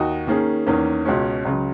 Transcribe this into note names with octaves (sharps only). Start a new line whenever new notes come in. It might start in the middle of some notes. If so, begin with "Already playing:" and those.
Already playing: D#2 D#4 F#4
D#3 A#3 C#4 G#4
E2 D#3 A#3 C#4
C#2 B2 G#3 C#4
C#2 C#3 F#3